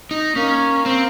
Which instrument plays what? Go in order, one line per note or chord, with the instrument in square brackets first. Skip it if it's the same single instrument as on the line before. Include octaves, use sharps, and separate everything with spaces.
[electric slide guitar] D#4
[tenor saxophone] A#3 [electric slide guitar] C#4
[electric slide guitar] C4